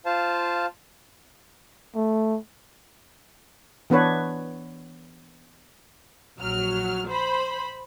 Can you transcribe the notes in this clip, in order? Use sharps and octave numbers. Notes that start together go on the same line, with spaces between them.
F4 C5 F5 A5
A3
E3 B3 D4 B4 C#5
A#1 F#3 F6
C5 B5